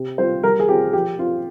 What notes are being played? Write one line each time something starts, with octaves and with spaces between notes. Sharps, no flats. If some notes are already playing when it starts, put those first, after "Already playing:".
Already playing: C3
G3 C4 F4 C5
G3 A#4
G#4
C4 F4 G4
F3 G4
C4 F4